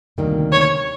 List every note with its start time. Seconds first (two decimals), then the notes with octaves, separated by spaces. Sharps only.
0.18 D2 C3 D#3 G3 A#3
0.52 C#5